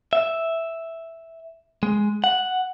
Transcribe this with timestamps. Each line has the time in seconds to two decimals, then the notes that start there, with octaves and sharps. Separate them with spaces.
0.13 E5
1.83 G#3
2.24 F#5